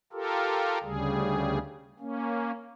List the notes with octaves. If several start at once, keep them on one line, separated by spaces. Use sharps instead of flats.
F4 G4 A4 A#4
D2 C#3 G3 G#4
A#3 C#4